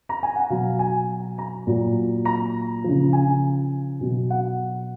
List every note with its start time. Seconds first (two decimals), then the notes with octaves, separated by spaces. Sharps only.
0.09 A#5
0.23 G#5
0.36 F#5
0.50 B2 F#3 F5
0.79 G#5
1.38 A#5
1.67 A#2 F#3
2.25 A#5
2.84 C#3 F3
3.13 G#5
4.01 B2 F#3
4.30 F#5